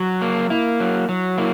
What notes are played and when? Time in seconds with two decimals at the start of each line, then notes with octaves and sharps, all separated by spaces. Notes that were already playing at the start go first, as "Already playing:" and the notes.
Already playing: F#3 F#4
0.22 A#3
0.50 A#3 E4
0.80 F#3
1.09 F#3
1.38 A#3 E4